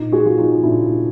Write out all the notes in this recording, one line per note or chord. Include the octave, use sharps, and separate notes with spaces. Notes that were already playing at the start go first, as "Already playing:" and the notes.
Already playing: A#2 D#4
F#4 G#4
F3 F#4
D#4 F4
A#2 D4 E4